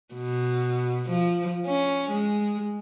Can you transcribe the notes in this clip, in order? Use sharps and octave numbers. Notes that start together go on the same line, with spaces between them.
B2
F3
C#4
G#3